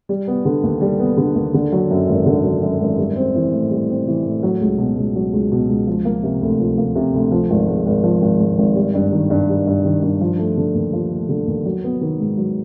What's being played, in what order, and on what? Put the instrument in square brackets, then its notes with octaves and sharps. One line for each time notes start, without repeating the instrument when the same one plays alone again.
[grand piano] G3
B3
D3
D#2
G3
B3
D3
D#2
D3
F#3
F#2
G#1
D3
F#3
F#2
G#1
G3
C4
E3
A2
G3
C4
E3
A2
F#3
C#2
B2
C#2
F#3
C#2
B2
C#2
F3
A#3
C3
D2
F3
A#3
C3
D2
F3
G#1
G#2
G#1
F3
G#1
G#2
G#1
G3
G2
D#3
G2
G3
G2
D#3
G2
F3
A3
D3
D#2
F3
A3
D3
D#2
F#3
B3
D#3
G#2
F#3